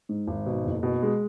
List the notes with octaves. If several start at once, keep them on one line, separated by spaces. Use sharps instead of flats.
G#2
G#1
B2
F#1
B2
G#3